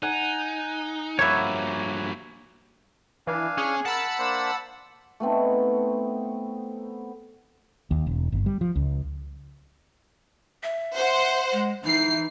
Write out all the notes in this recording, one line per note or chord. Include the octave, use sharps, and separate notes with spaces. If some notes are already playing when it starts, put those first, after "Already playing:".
D#4 F#5 G#5
G2 F3 A#3 F#4 B4 C#5 E5
E3 D4 F5 G#5
C#4 G#4
A#4 F#5 A5 B5 E6
A#3 D4 C5
A3 B3 C4 D#4
D#2
E1
G1
G3
F3
C#2
E5
C5 F#5
G#3
E3 D#4 C7